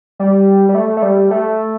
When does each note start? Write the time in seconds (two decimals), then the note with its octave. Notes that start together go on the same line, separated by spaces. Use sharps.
0.19 G3
0.69 G3
0.75 A3
0.97 A3
1.02 G3
1.31 A3